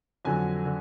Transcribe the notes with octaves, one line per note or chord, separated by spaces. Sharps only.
F2 D3 F#3 G#5
D3